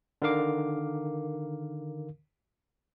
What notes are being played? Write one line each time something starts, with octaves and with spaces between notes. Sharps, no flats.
D3 D#3 A#4 F5 D6